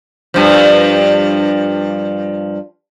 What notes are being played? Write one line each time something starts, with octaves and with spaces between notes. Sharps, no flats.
G2 F3